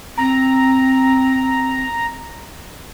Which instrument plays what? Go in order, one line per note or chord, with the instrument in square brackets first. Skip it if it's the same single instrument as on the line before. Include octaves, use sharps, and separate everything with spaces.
[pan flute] C4 [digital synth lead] A#5